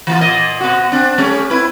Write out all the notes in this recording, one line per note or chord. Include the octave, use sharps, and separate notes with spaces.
E3 A#3 F4
A#2 A#3 D#5
B2 F#4
C4 D4
G3 A3 C#4
C4 E4 B4